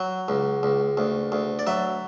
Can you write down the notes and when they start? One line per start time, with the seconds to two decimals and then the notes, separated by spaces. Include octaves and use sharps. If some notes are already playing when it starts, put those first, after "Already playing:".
Already playing: F#3
0.28 C#2
0.63 C#2
0.97 D2
1.32 D2
1.59 D5
1.67 F#3 E5